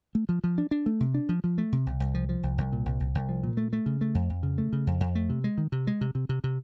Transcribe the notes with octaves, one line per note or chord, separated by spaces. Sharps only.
A3
F3
F3
D4
D4
A3
C3
D4
F3
F3
A3
C3
C2
C2
F3
F3
C2
C2
A#2
C2
C2
C2
F3
A#2
A3
A3
C#3
A3
F2
F2
C#3
A3
C#3
F2
F2
A3
C3
G#3
D#3
C3
G#3
C3
C3
C3
C3